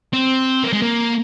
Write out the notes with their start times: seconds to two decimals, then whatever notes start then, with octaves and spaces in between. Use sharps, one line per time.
0.13 C4
0.63 A#3
0.73 G#3
0.82 A#3